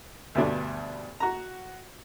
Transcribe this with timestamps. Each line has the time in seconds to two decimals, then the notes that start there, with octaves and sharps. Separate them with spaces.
0.35 D2 G2 B2 D4
1.20 F#4 A#5